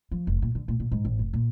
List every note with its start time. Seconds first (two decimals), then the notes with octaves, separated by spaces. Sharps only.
0.11 F3
0.27 F1
0.42 A#2
0.55 D3
0.68 A#2
0.80 A#2
0.92 G#2
1.05 A1
1.19 F1
1.33 A#2